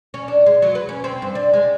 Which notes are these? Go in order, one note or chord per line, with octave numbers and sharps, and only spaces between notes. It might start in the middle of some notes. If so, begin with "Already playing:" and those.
C#4
D4
G#3
F#3
B4
C#4
C4
G2
D4
G#3